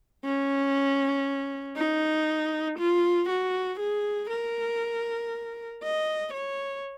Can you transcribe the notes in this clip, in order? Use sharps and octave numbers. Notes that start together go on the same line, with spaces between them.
C#4
D#4
F4
F#4
G#4
A#4
D#5
C#5